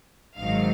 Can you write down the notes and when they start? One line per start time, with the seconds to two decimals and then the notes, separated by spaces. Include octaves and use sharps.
0.37 G#1 G#2 D#3 F#3 F5